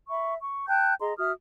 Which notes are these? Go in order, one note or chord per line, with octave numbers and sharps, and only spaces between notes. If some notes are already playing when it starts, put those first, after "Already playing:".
E5 B5 C#6
C#6
G5 A5 F#6 G6
G#4 D#5 A#5 C6
F#4 E5 D#6 F6